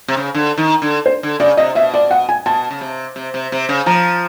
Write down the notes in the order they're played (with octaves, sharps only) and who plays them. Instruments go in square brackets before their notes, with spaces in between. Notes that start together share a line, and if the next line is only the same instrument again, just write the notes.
[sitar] C3
C#3
D3
D#3
D3
[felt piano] C5
[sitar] D3
[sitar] C#3 [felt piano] D5
[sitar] C3 [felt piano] D#5
[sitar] B2 [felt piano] E5
[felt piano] D5
F#5
G#5
[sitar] B2 [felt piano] A5
[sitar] C#3
C3
C3
C3
C3
C#3
[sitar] F3 [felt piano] A#5